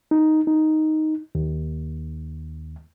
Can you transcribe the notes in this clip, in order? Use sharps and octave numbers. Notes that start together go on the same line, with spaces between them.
D#4
D#4
D#2